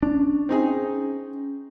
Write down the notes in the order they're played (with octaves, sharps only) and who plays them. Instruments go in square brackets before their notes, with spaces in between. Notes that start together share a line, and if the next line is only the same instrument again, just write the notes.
[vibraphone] C#4 [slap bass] D4
[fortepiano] C4 D#4 G#4